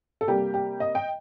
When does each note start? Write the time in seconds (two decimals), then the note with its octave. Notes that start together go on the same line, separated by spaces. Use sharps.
0.21 A4
0.27 C3 G3 A#3 G4
0.54 G4
0.80 D#5
0.95 G5